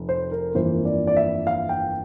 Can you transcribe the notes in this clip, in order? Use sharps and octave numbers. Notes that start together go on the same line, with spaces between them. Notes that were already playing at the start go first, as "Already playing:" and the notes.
Already playing: F1
C5
A#4
G1 F2 E3 A#3 C5
D5
D5
E5
F5
G5